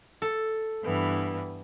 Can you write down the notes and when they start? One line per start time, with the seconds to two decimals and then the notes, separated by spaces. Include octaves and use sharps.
0.22 A4
0.84 G2 E3 B3